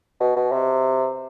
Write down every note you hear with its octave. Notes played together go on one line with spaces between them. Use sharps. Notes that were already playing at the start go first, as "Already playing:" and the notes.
B2
B2
C3